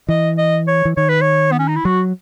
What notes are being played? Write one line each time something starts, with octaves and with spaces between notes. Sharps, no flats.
E3 D#5
D#5
C#5
E3
D#3 C#5
B4
C#5
B3
C#4
D#4
E4
F#3 F#4